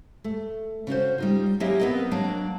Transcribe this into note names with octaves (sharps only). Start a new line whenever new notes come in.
A3
C#3 C#4 F#4 C5
G3 D#4 F4
F#3 A#3 C#4 E4 G4 D#5
B3 C4 A#4 B4 D#5
F#3 A#3 D4